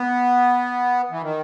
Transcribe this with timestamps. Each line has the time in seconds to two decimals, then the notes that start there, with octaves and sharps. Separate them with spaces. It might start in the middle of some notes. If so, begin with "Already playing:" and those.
Already playing: B3
1.11 E3
1.22 D#3